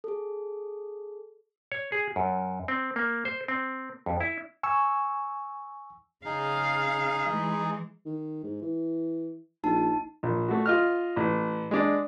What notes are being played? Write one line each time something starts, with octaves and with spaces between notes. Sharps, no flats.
G#4 A4
C#5
G#4
F#2
C4
A#3
C5
C4
F2
E4
G#5 C#6 E6
C#3 D#4 G#4 F5
E3 G#3
D#3
G#2
E3
A#1 D#4 A5
A#1
A3 F#4
F4 D#5 F6
A1
G#3 D4